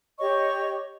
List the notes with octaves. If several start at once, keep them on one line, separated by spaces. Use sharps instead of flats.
G4 C#5 D#5 C#6